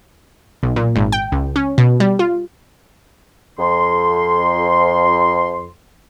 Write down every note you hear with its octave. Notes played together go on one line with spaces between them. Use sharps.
B1
A#2
G#1
G5
C#2
C#4
B2
G3
F4
F2 C6